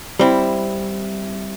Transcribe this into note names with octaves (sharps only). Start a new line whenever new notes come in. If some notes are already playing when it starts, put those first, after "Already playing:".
G3 C4 E4